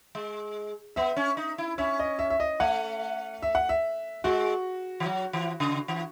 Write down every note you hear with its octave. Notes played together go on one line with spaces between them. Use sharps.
G#3
B3 E5
C#4
D#4
E4
C#4 E5
D#5
E5
E5
D#5
A3 F#5
E5
F#5
E5
G#3 F#4
E3
F#3
E3
C#3
E3